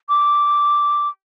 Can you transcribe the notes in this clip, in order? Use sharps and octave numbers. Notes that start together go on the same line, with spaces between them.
D6